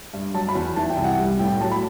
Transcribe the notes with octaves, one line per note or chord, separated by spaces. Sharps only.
G2
F#3 A5
B5
E2
E3 A5
G5
C2
F#5
G3
A2 G5
F#3 A5
B5